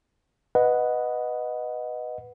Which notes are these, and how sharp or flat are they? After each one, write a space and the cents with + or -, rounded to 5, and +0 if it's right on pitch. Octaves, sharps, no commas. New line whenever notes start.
B4 +0 D#5 +0 F#5 -10